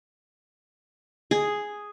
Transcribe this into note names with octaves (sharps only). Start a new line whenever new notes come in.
G#4